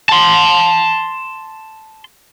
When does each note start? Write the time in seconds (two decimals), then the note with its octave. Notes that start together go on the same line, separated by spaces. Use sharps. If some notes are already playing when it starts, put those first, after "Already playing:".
0.09 A5 C6